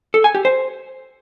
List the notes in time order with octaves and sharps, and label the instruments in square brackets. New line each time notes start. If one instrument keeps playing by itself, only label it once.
[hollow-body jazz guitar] A4
G#5
G4
C5